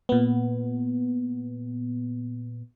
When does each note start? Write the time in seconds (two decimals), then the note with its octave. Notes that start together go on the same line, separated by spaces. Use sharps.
0.09 A#2 B3